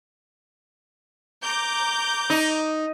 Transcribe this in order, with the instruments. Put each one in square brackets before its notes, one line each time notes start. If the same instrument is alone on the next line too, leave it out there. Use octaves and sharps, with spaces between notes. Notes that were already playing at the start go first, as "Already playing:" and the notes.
[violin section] A#5 D6 G6
[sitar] D#4